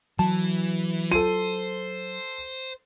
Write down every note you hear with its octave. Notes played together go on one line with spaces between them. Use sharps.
E3 F#3 A5
F4 A4 C5 D#7